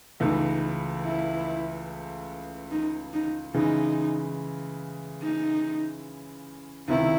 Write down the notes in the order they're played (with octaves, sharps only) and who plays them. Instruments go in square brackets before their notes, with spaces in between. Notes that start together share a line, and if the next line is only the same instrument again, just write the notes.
[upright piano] C#2 C#3 E3 A3 [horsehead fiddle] D#4
[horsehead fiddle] E4
D#4
D#4
[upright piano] C#3 E3 G#3 [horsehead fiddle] D#4
[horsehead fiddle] D#4
[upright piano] C#2 C3 D#3 [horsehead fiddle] E4